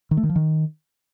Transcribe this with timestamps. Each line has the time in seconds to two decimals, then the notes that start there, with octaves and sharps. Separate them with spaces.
0.11 D#3
0.17 A3
0.23 D#3
0.29 F3
0.36 D#3